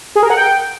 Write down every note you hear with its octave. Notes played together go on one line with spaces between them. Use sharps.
G#4
A#4
F#5
G5